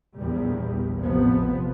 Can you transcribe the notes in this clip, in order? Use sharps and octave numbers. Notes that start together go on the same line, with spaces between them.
A#1 E2 A#2 G3
A1 C3 F3 B3